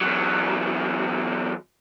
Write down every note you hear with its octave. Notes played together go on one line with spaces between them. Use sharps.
E2 F#3